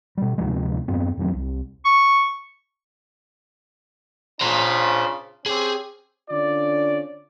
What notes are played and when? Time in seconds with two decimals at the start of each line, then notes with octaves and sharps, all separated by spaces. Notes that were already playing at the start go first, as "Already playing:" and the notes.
0.17 B2 G3
0.38 D2 C3 F3 G#3
0.88 F#2 B3 C4
1.17 G#1 F2 F#3 C4
1.34 C2
1.85 C#6
4.41 C#3 D4 F4 C5 A#5
5.46 C4 C#4 G4 G#4
6.31 D3 C#4 D4 F4 D5